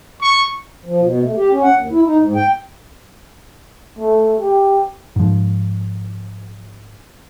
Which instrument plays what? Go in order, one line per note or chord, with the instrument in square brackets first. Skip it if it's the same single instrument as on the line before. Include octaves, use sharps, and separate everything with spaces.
[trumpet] C#6
[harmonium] F3
B2
A3
G4
C#4
F#5
D#2
E4
D#4
G#2
G5
[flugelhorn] A3
G4
[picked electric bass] G#2 F3